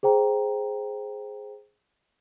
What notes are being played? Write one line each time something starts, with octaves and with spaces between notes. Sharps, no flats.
G#4 C5 G5 A#5